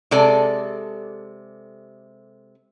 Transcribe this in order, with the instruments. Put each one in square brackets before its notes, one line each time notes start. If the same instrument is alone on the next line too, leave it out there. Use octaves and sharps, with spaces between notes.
[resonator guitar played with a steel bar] C3 G#3 A4 D5